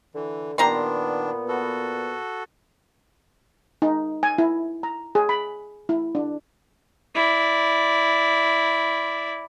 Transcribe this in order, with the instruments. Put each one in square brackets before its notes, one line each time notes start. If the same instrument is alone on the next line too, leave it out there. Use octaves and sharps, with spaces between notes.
[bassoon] D3 [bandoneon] E3
[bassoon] A#2 [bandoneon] D#3 D4 [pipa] G3 A#5 C6 [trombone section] B3
[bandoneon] F#4 A4
[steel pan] D#4
G#5
E4
A#5
G#4
B5
E4
D4
[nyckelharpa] E4 D5